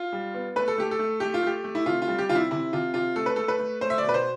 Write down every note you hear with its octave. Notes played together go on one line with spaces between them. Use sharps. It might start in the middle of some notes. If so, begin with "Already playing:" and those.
Already playing: F4
G3
B3
A3 B4
A4
A3 G4
A4
A3
A3 G4
F4
A3 G4
A3
E4
C3 F4
F4
G3
G4
C3 F4
E4
C3 E4
C3 F4
C3 F4
A3 A4
B4
A3 A4
B4
A3
A3 C5
E5
D5
B2
B4
C5